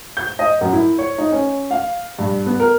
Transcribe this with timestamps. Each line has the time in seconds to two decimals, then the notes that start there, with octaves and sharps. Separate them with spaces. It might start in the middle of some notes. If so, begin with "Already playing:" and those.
0.17 G6
0.39 D#5
0.61 F#2
0.73 E4
0.98 C#5
1.18 D#4
1.32 C#4
1.71 F5
2.19 G2
2.46 B3
2.60 A#4